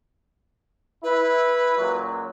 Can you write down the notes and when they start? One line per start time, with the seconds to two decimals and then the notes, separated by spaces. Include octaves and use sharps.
1.03 E4 B4
1.78 C#2 A#2 F#3